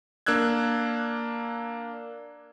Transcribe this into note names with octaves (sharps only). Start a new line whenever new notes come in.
A#3 D4 E6 F#6 G#6